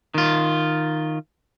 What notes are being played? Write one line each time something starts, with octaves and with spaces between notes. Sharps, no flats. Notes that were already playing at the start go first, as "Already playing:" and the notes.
D#3 F4